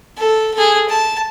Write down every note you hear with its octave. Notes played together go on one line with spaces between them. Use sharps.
A4
G#4 A4
A5